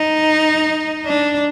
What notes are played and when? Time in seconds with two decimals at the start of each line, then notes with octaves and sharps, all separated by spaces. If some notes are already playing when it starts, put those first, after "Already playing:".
Already playing: D#4
1.06 D4